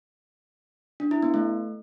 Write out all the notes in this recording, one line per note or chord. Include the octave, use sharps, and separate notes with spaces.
D4
E4
B3
A3